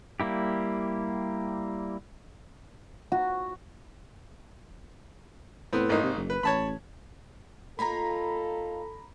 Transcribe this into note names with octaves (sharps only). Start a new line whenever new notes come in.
G3 A#3 E4 G4
F#4
A2 B3 C4
G#1 A#3 D#4
C3
F#1
B4
A1 C#5 A5 B5
A#3 D#4 F4 A4 A#5 B5